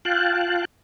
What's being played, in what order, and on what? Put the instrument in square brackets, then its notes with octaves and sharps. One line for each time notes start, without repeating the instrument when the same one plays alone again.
[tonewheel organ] F4 F5 G5 A5 F#6